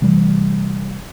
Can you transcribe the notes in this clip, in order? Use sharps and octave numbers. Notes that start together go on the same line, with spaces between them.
C3 E3 G3 A3